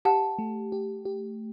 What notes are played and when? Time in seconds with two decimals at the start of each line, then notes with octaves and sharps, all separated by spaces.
0.05 G4 F#5 A5
0.39 A3
0.72 G4
1.05 G4